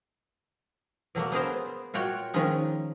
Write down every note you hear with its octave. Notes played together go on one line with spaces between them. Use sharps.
B2 F#3 A3 A#3
B3 G#4 A#4 C5
A#2 F4 F#4 C#5 G5
D#3 F3 G#3 C#4 D#4